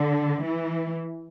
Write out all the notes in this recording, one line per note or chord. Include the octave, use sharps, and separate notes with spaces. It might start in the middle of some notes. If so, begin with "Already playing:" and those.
Already playing: D3
E3